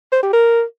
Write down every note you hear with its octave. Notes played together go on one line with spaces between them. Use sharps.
C5
G4
A#4